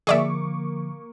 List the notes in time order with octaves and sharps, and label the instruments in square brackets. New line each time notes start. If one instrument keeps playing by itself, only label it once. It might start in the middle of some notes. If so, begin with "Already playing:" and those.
[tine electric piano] D3 F3 [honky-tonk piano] A#3 C#6 D6 [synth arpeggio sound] G#4 D5 E5